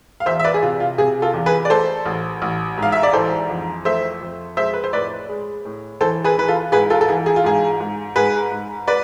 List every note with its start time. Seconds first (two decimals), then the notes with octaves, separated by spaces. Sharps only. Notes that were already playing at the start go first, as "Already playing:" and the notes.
0.20 F5
0.26 E2 C5 E5
0.39 E5
0.44 B4 D5
0.54 G#4
0.62 C3 F4
0.80 F4
0.98 C3 G#4
1.22 F4 A4
1.34 E2
1.46 G#4 B4
1.65 D5
1.70 A3 A4 C5
2.06 A1
2.42 A1
2.78 G#2 F5
2.92 E5
3.03 D5
3.13 E3 A4 C5
3.50 F2
3.85 A3 C5 E5
4.21 F2
4.57 G#3 C5 E5
4.74 B4
4.84 C5
4.93 A2 B4 D5
5.29 G#3
5.65 A2
6.01 E3 A4 C5
6.24 G#4 B4
6.37 E3 B4
6.48 F4 A4
6.72 G#2 G#4 B4
6.90 F4 A4
7.01 A4
7.08 E3 G#4
7.26 G#4
7.36 F4
7.44 G#2 G#4
7.80 G#2
8.16 G#2 G#4 B4
8.52 G#2
8.87 B4 D5